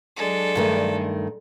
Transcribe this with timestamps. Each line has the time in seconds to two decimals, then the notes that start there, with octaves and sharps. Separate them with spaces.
0.17 F#3 G#3 D4 A4
0.55 G2 D#3 A3